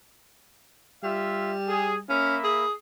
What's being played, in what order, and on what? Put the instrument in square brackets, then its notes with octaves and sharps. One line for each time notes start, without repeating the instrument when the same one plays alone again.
[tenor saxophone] G3 [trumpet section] F4 E5
[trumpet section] G#4
[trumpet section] A#3 E5 B5 [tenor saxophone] C#4
[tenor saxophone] G#4